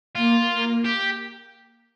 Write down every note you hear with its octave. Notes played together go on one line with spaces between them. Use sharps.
A#3 F4
A#3
G4